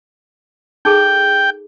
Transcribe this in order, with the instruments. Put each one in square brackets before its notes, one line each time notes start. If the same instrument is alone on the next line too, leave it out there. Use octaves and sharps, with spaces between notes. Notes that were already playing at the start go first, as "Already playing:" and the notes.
[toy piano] D#4 G#4 A4 [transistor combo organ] G5